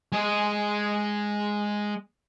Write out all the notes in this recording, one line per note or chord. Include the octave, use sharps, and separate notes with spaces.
G#3 D#5